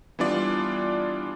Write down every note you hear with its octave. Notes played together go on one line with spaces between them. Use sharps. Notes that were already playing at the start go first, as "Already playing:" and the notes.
E3 G3 B3 D4 F4 D5